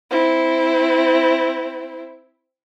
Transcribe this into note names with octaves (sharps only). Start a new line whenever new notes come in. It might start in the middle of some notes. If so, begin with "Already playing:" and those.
C4 E4